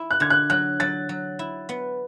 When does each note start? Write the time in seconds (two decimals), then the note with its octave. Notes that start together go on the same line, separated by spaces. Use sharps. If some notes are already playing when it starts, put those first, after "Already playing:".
Already playing: E4
0.11 F#6
0.20 D3 G#6
0.30 F#6
0.50 F#3 F#6
0.80 F#3 A6
1.09 F#3
1.39 E4
1.69 B3